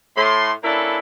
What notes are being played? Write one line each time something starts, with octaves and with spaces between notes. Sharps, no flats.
A2 C6
A#3 C#4 D4 E4 A4 B4